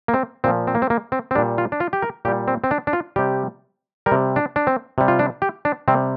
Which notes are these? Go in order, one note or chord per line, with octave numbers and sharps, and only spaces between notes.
A#3
C4
A#2 F3 C4
C4
A#3
C4
A#3
C4
C4
A#2 G3 D4
F4
D4
F4
G4
A#4
A#2 G3 G4
C4
C4
D4
D4
F4
C3 G3 G4
G3 A#4
C3
D4
D4
C4
C3 G3
F4
D4
G4
D4
C3 G3 C4